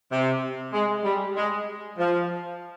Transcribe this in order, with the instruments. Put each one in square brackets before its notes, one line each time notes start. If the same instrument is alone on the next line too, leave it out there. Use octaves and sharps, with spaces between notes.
[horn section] C3
G#3
G3
G#3
F3